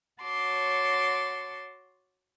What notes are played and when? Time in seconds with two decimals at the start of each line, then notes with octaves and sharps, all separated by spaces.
0.22 F#4 C#5 A5 C6 D6